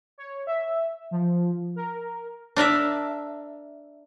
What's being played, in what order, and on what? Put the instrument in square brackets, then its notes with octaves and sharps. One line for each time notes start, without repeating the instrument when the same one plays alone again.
[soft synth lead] C#5
E5
F3
A#4
[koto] D4 A#4 D5 E5